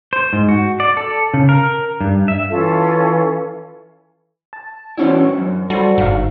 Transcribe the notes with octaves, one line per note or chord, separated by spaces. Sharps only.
C5
G#2
F#4
D5
A4
C#3
A#4
G2
E5
E3 C#4 F4 A4
A5
E2 C#4 D4 E4 F#4 C5
F#2
G3 F#4 A4 C5
G1 G#2 D4 F5